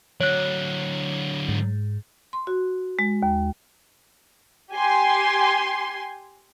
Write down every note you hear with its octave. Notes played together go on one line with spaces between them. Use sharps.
D3 F#3 C#5 F#6
G#2
C6
F#4
G#3
D#2
G4 G#5 C6